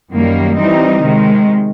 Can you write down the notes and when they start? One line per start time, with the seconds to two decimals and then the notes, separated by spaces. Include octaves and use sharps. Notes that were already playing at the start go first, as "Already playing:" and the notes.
0.11 F#2 D#3 G3 A#3
0.57 E3 G3 C4 D#4
1.03 C3 D#3 G#3